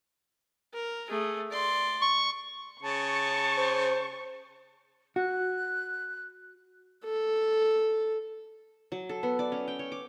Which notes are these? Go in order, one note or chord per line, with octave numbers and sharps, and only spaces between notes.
A#4
A3 G#4
D5 C6
C#6
C#3 A5 C#6
C5
F#4 F#6
A4
F#3
A4
B3
D5
C#4
G5
C#5
D6